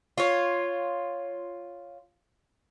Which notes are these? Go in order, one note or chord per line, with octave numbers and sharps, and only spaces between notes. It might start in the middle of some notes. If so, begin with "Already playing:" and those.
F4 C#5